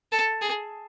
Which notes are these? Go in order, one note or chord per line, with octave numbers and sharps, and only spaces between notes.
A4
G#4